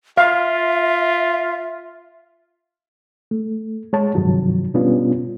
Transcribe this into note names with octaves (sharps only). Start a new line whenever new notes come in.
F4 E5 F5
A3
G#3 C#5 A5
G2 C3 D#3 F3 F#3
B2 G3 B3 C#4 D4 F4